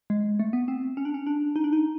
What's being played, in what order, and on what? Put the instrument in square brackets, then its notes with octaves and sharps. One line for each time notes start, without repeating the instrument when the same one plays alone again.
[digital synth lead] G#3
A3
B3
C4
C#4
D4
C#4
D4
D#4
D4
D#4